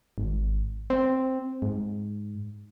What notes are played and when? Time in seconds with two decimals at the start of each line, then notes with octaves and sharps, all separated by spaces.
0.18 G#1
0.90 C4
1.62 G#2